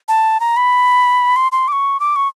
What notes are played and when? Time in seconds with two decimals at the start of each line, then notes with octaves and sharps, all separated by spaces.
0.08 A5
0.40 A#5
0.57 B5
1.36 C6
1.52 C6
1.68 D6
1.72 C#6
2.00 D6
2.16 C#6